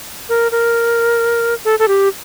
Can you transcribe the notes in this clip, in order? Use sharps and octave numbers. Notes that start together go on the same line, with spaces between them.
A#4
A#4
A4
A4
G4